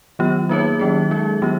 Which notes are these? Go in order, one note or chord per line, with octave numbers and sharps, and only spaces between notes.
D#3 F#3 B3 F4
A#3 D#4 G#4 C#5
D#3 F#3 C#4 G#4
G#3 D#4 G#4
D#3 F#3 B3 F4